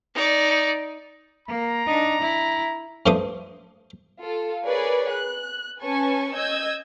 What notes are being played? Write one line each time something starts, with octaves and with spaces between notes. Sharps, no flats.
D#4 D5
A#3 A#5
D4 D#4
E4
G2 F3 A3 C6 D6 D#6
F4 A4
G#4 A#4 B4 C#5 D5
F#6
C#4 B4 G#5 A5 C#6
D#5 E6 G6 G#6